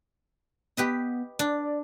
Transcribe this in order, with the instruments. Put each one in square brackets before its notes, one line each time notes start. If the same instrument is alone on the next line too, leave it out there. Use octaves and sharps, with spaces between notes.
[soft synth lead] B3 [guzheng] G4 B4 D#5
[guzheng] D4 [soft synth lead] D5